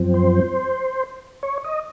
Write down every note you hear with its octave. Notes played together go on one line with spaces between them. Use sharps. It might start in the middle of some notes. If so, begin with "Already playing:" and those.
Already playing: F#2 F3 C4
C5
C#5
D#5